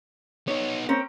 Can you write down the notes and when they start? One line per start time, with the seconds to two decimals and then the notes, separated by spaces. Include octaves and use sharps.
0.48 B3 D#4 C#5
0.89 C4 C#4 A#4